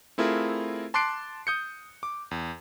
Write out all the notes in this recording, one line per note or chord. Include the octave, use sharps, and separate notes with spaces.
A3 C4 E4 F4 G#4 A#4
A5 C6 D6 F#6 C7 D7
D#6 G6 C#7
D6
E2